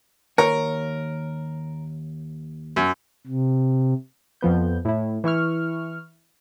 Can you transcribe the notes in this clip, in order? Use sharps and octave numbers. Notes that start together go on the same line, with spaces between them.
D#2 A#4 C#5
F#2
C3
F2 F3 B3 G6
A2 E4
E3 E4 C#6 F6